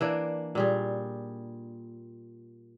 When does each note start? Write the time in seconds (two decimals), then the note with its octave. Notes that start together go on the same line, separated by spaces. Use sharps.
0.01 E3 A#3 D4
0.55 A#2 G3 G#4